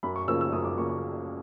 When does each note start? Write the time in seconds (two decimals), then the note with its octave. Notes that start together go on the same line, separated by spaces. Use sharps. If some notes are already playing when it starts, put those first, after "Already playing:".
0.03 F#2 B5
0.16 C#6
0.28 C#3 F3 A#3 E6
0.41 E6
0.53 F#2 D#6
0.64 D6
0.78 C#3 F3 A#3 C#6
0.90 C#6